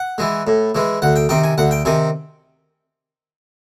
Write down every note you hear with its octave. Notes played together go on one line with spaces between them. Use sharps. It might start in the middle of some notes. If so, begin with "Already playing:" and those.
Already playing: F#5
E3 G#3
A2
E3 G#3
D2 F#5
G5
C3 D#3 G5
G#5
D2 F#5
G5
C3 D#3 G#5